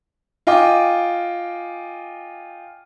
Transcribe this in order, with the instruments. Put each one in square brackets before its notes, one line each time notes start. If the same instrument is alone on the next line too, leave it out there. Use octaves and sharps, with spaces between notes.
[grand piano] F4 D#5 G5 G#5 D6